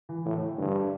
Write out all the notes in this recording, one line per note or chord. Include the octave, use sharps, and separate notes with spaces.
E3
A2 E3
E3
G2 D3